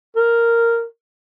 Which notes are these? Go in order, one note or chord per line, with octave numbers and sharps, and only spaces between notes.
A#4